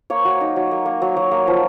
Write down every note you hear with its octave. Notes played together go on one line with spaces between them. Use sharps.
A#3 C#5
F#3
D#4
F#3
A#3
A#3
F#3
F#3
A#3
F3